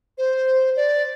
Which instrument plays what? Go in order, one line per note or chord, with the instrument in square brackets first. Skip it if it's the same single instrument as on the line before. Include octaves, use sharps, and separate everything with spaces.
[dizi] C5
D5